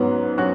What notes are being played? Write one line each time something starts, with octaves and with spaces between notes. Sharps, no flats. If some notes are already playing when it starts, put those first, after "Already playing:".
Already playing: G#2 F#3 B3 C#4
F#3 C#4 F#4